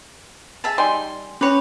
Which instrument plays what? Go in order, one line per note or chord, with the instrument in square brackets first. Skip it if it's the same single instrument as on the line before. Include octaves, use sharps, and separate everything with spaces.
[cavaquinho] G#4 E5 A5
[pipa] G3 D#4 G#5 [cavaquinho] C6
[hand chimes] C#4 [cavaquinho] B4 C#5